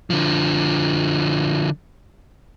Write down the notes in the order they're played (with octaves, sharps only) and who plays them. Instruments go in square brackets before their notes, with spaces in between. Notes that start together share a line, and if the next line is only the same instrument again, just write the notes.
[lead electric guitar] D3 F3